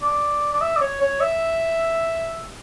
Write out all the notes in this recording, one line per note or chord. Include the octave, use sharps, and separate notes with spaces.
D5
D5
E5
D5
C#5
C#5
E5